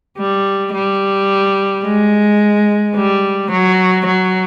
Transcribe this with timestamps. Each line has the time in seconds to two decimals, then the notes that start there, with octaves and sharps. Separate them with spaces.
0.18 G3
0.74 G3
1.84 G#3
2.95 G3
3.51 F#3
4.06 F#3